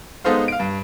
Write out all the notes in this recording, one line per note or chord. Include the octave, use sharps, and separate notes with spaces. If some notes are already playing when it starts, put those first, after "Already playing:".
G#3 B3 D#4 A4 C5 F5
F5 D7
G2